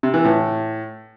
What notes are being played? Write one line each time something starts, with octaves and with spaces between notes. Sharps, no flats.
C3
E3
A2